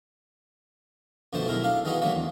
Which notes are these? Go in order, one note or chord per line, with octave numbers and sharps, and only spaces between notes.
F2 B2 D3 A3 C5 A5
B1 B2 G#3 E4 A#4
D4 A4 F5
E3 G#3 B3 D#4 F#4
D3 E3 F#3 A3 A#3
E2